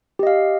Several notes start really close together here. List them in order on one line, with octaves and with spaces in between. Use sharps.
G4 D#5 F5